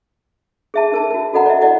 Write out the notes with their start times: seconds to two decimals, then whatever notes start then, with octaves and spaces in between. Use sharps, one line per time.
0.74 G#4 E5 A5
0.92 D#4 A#4 A5
1.11 F#4 A#4
1.33 F#4 A4 D#5 F#5 A#5
1.46 D5 E5
1.61 E4 D5 D#5 F#5